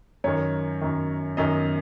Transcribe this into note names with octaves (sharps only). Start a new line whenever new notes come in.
F#2 D#3 C#5
F#2 D#3
F#2 D#3 D#5